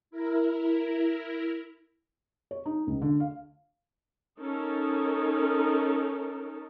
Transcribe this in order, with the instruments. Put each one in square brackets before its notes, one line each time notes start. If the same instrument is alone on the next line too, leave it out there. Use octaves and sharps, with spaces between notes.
[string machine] E4 A#4
[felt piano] C#5
D#4
C#2
D3
F5
[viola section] C#4 D#4 A4 A#4